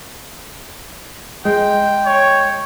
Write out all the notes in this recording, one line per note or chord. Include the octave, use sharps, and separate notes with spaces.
G#3 G5
C#5